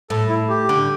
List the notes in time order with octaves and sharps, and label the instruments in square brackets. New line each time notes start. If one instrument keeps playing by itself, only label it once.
[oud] A2 [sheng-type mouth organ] A4
[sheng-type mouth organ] E4
G4
[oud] D3